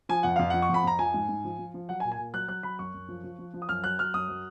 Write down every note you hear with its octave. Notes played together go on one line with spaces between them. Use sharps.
F3 G#5
F2 F#5
F2 F5
F3 F#5
C#6
F2 B5
F2 A#5
F3 G#5
G#2
G#2
F3
F3
F3
F#3 F#5
G#5
A#2
G#5
A#2
F#3 F#6
F#3 F#6
F#3 B5
F#2 C#6
F#2
F3
F3
F3
F3
D#6
F#2 F6
F#3 F#6
F#3 F6
F#2 D#6
F#3